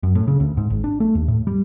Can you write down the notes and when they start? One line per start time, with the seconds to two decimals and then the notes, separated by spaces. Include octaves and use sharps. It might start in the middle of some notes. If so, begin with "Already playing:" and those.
0.03 F#2
0.15 A2
0.28 C#3
0.40 D2
0.57 G#2
0.70 G#1
0.84 D4
1.00 A3
1.15 D#2
1.28 A2
1.47 G3